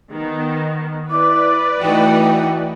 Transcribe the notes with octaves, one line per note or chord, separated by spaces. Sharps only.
D#3 B3
E4 B4 D5 D6
E3 A3 D#4 F#4 G5